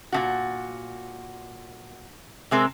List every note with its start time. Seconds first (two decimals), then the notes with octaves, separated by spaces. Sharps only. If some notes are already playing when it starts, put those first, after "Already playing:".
0.12 A#2 C#3 F#4
2.51 C3 G#3 C4 A#4